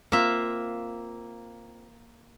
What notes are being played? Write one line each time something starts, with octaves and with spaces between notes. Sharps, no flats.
A#3 C4 F4 E5